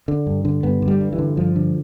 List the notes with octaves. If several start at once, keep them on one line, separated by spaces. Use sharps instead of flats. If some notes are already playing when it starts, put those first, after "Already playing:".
D3
G2
D3
G2 B3
D3
G3
G2
E3
D3
G2 F3
D3